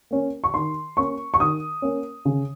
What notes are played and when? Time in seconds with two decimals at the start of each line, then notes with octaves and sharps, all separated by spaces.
0.11 A#3 C#4
0.44 C#6
0.54 D#3 C6
0.97 A#3 C#4 C#6
1.34 C#6
1.40 D#3 D#6
1.82 A#3 C#4
2.25 C#3